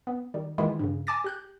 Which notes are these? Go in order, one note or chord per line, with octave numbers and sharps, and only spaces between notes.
B3
D#3 G3
D#3 E3 G#3 A#3 E4 F4
G2 C#3
G#5 A5 D6 A6 A#6
G4 F#6 G6